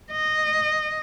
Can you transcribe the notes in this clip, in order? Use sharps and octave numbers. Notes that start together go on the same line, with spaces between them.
D#5